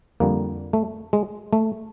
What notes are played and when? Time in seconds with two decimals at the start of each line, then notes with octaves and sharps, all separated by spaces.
0.20 F2 D3 G3 A#3
0.73 A3
1.13 G#3
1.53 A3